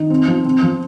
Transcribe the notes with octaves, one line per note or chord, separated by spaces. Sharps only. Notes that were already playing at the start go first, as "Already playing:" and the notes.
Already playing: D#3
C4
F3
C4
F3